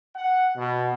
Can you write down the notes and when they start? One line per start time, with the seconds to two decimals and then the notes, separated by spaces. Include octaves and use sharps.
0.16 F#5
0.56 B2